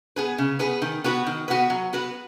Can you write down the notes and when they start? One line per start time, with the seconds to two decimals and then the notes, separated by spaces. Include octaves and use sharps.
0.16 B3 G#4 B4
0.38 C#3
0.59 B3 G#4 B4
0.82 D#3
1.04 B3 F#4 B4
1.27 D#3
1.48 B3 F#4 B4
1.70 F#3
1.93 B3 F#4 B4